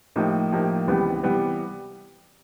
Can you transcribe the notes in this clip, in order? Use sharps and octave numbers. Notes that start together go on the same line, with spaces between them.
A2 F3 A#3 D#4 G4
A2 F3 A#3 D#4 G4
C#2 C3 E3 G3 B3
C3 E3 G3 B3